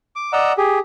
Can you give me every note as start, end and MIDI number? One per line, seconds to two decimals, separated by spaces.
0.16 0.32 86
0.33 0.53 74
0.33 0.53 75
0.33 0.53 78
0.33 0.53 82
0.33 0.53 88
0.57 0.79 67
0.57 0.79 68